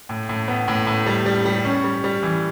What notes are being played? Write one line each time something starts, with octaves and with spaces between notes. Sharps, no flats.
A2
A2
B3
A2
A2
G3
G3
G3
C#4
G3
G3
E3